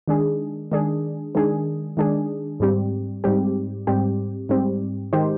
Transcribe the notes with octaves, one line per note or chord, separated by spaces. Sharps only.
D#3 G#3 D4 G#4
D#3 G#3 D4 G#4
D#3 G#3 D4 G#4
D#3 G#3 D4 G#4
G#2 G3 C4 G4
G#2 G3 C4 G4
G#2 G3 C4 G4
G#2 G3 C4 G4
D#3 G#3 D#4 G4 C5